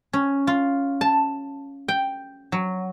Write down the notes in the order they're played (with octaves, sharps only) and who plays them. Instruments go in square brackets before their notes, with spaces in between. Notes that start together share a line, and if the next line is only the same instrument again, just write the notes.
[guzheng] C#4
F4
A5
G5
F#3